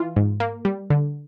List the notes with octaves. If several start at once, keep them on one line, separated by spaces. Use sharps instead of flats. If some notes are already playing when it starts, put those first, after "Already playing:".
Already playing: E3 F4
G#2
A#3
G3
D3